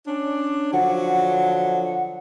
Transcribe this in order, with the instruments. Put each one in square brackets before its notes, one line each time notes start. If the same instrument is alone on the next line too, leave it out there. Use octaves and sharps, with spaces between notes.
[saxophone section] C#4 D4
[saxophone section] D3 F3 F#3 [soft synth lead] F#5